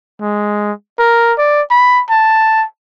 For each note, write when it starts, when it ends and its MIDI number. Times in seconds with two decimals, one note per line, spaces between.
0.22 0.72 56
0.99 1.33 70
1.38 1.62 74
1.70 2.02 83
2.10 2.64 81